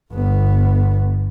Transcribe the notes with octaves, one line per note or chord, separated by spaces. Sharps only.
G1 B3